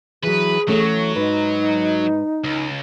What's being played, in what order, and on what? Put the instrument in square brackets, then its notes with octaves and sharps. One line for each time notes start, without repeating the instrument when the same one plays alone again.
[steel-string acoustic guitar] E3 F#3 [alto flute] G#4 [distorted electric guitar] B4
[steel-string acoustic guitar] E3 A3 C#4 [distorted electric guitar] F#3
[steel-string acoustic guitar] G#2 B4 [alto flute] D#4
[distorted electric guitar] C#2